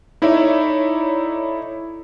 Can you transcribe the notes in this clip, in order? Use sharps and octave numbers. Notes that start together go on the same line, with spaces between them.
D#4 E4 A4 C#5 D5 E5